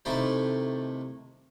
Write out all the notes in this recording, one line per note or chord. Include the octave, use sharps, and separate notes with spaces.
C3 D#3 A3 E4 A4 C5